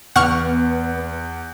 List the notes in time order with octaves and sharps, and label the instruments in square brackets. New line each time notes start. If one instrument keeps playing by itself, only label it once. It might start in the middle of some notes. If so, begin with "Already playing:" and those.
[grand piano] E2 [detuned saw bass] B3 [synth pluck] F#5 C#6 F6